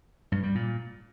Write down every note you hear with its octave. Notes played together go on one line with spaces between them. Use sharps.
G2
G3
A#2